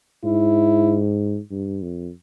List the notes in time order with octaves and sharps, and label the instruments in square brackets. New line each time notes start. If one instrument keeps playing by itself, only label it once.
[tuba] G#2 [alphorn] E4
[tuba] G2
F2